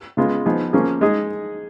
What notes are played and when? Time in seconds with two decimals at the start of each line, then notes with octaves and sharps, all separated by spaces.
0.17 C#3 G#3 B3 F4
0.46 F3 B3 D#4 G#4
0.73 F3 A#3 C#4 G#4
1.01 G#3 D#4 G#4